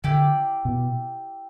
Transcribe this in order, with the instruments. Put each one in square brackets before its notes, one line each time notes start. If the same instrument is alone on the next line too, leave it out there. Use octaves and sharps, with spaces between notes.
[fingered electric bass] D3 [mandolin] E4 G4 D5 G5
[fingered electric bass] B2